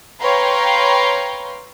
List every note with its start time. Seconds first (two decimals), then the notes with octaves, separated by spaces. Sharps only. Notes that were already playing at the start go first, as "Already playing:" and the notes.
0.21 B4 C#5 F5 G5 A#5 C6